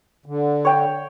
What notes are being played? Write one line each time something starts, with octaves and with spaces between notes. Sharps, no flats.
D3
C#5 G5